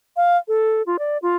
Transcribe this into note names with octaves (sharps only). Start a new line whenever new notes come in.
F5
A4
F4
D5
F4